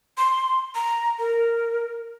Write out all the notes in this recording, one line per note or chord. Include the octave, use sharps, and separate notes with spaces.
C6
A#5
A#4